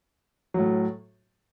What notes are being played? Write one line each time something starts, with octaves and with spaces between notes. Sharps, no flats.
A2 F#3